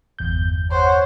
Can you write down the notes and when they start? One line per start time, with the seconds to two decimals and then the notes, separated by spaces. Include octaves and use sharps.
0.19 G1 E2 G6
0.71 C5 C#5 F#5